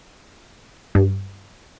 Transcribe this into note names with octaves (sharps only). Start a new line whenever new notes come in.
G2